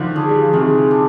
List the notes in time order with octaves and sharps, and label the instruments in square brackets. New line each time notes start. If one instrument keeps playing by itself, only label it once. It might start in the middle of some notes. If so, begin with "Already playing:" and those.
Already playing: [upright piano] D3 D#3 F3
[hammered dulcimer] D4 G#4
[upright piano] G3
F3
[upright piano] C3 D#3 [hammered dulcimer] G#3
[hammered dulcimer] D4